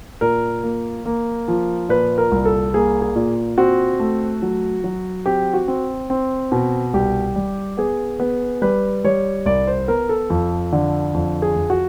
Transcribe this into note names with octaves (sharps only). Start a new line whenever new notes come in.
A#2 A#4
A#3
A#3
F3
A#2 B4
A#4
C2
A4
A#3 G#4
G#4
A#2
C4 F#4
A3
F#3
F#3
C4 G4
F#4
C4
C4
B2
C2 G4
G3
B3 G#4
B3
G3 B4
G3 C#5
C2 D5
C5
B3 A#4
A4
F2
D3
F2
G#4
F2
F#4